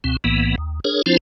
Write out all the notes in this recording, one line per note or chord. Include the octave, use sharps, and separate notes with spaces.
C#2 B2 C4
B1 A2 E3 A#3 B3
D#2
D4 G#4 A#4 C#5
F3 C4 D4 E4 F4 C5